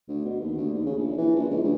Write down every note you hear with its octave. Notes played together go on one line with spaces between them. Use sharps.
D2
B2
D#2
D2
D#2
C#3
A#1
E3
A#1
C#2
D2